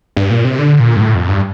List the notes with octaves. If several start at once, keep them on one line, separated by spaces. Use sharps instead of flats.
G2
A#2
C3
D3
A#2
G2
A2
F2
G2